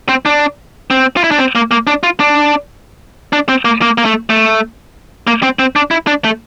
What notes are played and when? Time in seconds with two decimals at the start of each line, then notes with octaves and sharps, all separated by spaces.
0.09 C4
0.25 D4
0.90 C4
1.17 F4
1.24 E4
1.31 D4
1.39 C4
1.55 A#3
1.71 A#3
1.87 D4
2.03 F4
2.20 D4
3.33 D4
3.49 C4
3.65 A#3
3.82 A#3
3.98 A#3
4.05 A3
4.30 A3
5.27 A#3
5.43 C4
5.59 C4
5.76 D4
5.91 E4
6.07 D4
6.24 A3